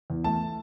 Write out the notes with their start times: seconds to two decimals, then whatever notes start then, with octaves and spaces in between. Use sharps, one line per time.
0.10 E2
0.24 A3 A5